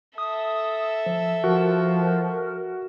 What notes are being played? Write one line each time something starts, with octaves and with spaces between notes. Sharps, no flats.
A4 E5 D#6
F3
F3 F#4 A#4